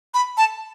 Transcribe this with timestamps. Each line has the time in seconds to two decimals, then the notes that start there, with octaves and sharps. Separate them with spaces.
0.14 B5
0.37 A5